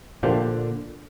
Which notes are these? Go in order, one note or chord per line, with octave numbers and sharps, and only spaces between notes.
A#2 D3 F3 A#3 D4 G4 C5